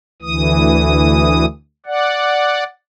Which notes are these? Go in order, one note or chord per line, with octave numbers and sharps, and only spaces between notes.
D2 E3 D#6
D5 F#5